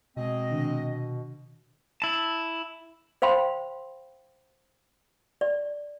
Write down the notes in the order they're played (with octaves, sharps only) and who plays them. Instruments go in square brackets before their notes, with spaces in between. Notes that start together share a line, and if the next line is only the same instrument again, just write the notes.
[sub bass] B2 [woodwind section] G#3 C4 D#5
[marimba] C3 D#3 D4
[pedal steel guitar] E4 A5
[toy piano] C5 F5 G5 B5 C6
D5